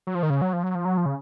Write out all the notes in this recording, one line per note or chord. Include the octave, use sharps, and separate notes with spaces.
F#3
F3
D#3
C#3
F#3
F3
F#3
F3
F#3
F3
C#3